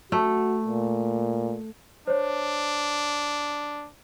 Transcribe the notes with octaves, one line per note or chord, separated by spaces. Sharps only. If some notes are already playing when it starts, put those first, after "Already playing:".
A3 F#4
A#2
D4 C5 C#5